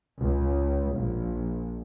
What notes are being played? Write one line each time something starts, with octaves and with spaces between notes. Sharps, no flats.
C#2
A#1